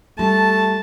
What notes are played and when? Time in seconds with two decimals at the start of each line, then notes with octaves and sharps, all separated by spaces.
0.19 G3 A3 A5